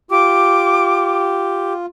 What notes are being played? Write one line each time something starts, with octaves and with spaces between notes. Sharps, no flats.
F4 G4 D6